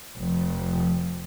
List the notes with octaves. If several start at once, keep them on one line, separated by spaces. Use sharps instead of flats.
F1 F3